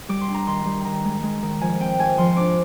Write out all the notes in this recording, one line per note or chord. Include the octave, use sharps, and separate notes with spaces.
G3 D6
C6
D4
A#5
D#3 C6
G3
D#3 A#5
G#3
G#3
D#3
F3 G#5
C4 G5
G#2 G#5
F3 C6
D4 D6